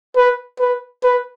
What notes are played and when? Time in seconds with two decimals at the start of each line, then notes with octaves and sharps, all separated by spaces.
0.16 B4
0.60 B4
1.04 B4